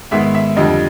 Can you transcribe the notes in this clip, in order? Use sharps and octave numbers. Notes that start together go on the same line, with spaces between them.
G#2 D#3 G#3 B3 E5
E5
F2 D3 G3 D#5